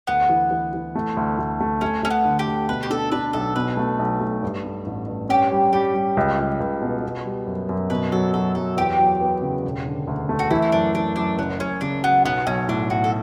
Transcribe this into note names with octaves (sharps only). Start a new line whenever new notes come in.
D2 B3
E3
E3
E3
A3
D2
D2
A3
A3 C#4
A3 C#4
B3
D3
G4
D2
B2 B4
G4
D4 A4
D4 B4
B1 A4
B2 B4
A3
B1
A3
G2
A3
A1
G2
C#4 G4
G3
G3 G4
G3
C#2
C#2
C#2
B2
B3
G3
F#2
F#2
B2 B4
F#3 A4
F#3 A4
F#3 A4
E2 G4
F#3
B3
C#3
E1
D3
D2
A3
F#4
E3 E4
E4
F#2 D4
E3 D4
F#2 D4
F#1 B3
F#1 C#4
C#3 D4
F#3 B3
B1 B3
B1 C#4
A2 D4
A2 F#4
A4